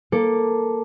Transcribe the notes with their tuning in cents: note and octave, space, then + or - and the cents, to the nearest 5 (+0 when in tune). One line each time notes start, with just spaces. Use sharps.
A#3 +0 A4 +0 D6 +0